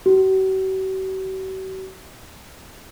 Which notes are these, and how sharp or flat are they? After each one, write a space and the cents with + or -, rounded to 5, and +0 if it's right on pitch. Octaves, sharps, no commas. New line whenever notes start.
F#4 +45